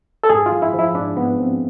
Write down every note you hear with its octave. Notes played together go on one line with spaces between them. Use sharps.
A4
G#2 G#4
F4
F3
E4
F3
E4
G#2 D4
G#2 B3
F3 C4